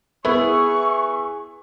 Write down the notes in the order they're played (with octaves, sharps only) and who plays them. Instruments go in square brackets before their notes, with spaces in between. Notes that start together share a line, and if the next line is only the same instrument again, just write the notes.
[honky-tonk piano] B3 E4 [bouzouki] G#4 [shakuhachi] C#6